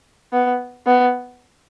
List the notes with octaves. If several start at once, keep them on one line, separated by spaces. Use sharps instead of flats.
B3
B3